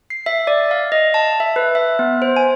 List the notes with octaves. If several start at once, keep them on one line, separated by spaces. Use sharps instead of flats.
C7
E5
D5
F5
D#5
A5
E5
B4
E5
B3
C5
G#5